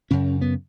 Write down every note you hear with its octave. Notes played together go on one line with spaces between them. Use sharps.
F#2 C#3 C#4
B3